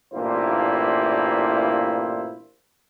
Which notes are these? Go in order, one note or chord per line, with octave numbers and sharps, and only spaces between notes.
A1 G2 A#2 A#3 E4 C5